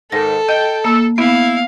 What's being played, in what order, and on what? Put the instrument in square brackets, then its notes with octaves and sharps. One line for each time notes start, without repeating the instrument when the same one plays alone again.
[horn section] G#2 D#3 [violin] A4 [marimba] A#6
[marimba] D#5 [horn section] G5
[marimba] A#3 [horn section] A4
[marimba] B3 [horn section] E4 [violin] F5